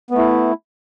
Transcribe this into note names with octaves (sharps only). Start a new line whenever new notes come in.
A3 B3 E4